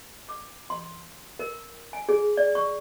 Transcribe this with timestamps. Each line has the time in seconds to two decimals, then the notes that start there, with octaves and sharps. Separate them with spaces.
0.29 D6
0.70 C6
1.39 A#4
1.93 G#5
2.09 G#4
2.37 D5
2.55 C#6